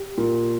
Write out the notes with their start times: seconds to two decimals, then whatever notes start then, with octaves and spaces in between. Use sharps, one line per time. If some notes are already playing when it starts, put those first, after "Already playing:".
Already playing: G4
0.18 A#2